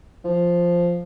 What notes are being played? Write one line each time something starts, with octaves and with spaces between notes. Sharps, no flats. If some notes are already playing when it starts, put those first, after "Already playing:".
F3